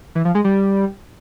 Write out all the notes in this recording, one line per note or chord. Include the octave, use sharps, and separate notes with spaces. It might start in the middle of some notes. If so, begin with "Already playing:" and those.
E3
F3
G#3
G3